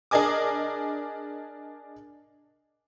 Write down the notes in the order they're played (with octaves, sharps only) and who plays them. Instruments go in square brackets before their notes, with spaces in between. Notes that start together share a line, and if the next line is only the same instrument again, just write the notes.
[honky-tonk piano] D4 G#4 A#4 D#5 G#5 D6